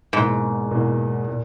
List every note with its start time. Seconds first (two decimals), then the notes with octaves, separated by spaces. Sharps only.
0.13 E2 G#2 B2 A#3
0.71 E2 B2 A#3
1.28 A#2